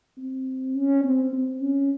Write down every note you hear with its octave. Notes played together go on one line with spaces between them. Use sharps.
C4
C#4
C4
C4
C#4